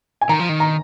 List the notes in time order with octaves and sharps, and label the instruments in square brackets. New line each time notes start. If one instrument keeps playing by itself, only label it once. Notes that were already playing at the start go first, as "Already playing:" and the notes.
[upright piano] G#5
[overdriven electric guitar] D#3 [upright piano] A#5
[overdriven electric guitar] F3
D#3
[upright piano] A#5